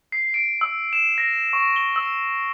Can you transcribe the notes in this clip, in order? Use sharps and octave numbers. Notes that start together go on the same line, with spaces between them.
C7
D7
E6
E7
A#6
C#6
G7
E6